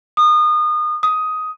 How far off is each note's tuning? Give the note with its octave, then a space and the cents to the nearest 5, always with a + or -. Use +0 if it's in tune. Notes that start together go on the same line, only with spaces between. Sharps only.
D#6 -30
D#6 +10